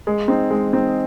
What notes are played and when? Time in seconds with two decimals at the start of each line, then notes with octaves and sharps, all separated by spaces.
0.07 G#3
0.28 C4 D#4
0.51 G#3
0.73 C4 D#4